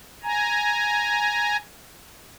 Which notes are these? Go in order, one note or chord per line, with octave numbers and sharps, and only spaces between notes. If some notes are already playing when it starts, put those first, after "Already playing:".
G#5 A#5